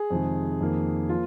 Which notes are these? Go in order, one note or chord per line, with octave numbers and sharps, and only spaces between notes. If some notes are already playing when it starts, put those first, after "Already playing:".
Already playing: G#4
F2 C3 D#3 G#3
F2 D#3 A#3
F3 A#3 F4